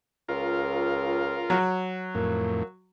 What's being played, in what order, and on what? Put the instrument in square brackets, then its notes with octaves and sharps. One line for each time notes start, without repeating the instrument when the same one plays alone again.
[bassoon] C#2 [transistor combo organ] F4 A#4
[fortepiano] F#3
[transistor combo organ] F2 A2 [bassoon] A#3